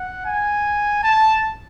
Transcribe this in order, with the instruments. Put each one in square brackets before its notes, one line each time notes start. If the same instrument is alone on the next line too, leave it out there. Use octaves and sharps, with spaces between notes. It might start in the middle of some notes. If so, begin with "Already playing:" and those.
Already playing: [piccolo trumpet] F#5
G#5
A5